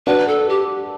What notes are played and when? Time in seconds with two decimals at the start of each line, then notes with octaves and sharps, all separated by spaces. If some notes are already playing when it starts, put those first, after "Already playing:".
0.07 D4 F#4 B4
0.28 A4
0.49 G4